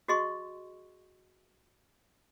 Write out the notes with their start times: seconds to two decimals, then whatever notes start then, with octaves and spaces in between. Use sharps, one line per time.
0.08 F#4 G#4 D#5 C6 C#6